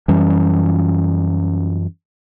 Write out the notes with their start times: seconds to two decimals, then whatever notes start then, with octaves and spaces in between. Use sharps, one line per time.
0.08 F#2 E3 G3 C#4